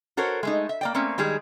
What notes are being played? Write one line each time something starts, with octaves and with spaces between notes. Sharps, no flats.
F#4 A4 A#4 C5 C#5
G#3 A3 D#4
E5
A#3 D5 G5
A3 A#3 C4 C#4
D#3 G3 G#3 G#4